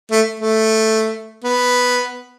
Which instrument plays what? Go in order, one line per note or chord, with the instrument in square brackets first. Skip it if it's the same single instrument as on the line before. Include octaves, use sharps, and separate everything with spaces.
[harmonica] A3
A3
B3